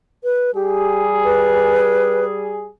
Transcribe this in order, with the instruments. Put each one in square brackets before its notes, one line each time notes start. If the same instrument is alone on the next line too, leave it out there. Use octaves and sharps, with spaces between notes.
[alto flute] B4
[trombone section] G3 G#4 [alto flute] G4
[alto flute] B4